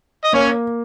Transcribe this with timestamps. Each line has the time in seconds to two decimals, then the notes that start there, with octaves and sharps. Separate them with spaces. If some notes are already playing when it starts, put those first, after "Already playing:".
0.25 D#5
0.33 A#3 C#4 C#5